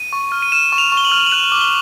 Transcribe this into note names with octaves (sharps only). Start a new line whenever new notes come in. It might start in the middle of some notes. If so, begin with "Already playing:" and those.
Already playing: D#7
C#6
F6
D#7
F6 E7
C#6
F7
C#6
G7
F#7
F6
F#7
F#6 F7
D6
G7